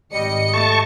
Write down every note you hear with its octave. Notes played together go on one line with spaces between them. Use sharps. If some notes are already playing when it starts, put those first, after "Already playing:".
G#1 G3 D#5 C#7
A3 A5 C#6